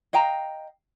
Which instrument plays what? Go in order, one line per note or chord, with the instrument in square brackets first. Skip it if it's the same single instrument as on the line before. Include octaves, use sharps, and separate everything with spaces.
[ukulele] D#5 F5 G5 A#5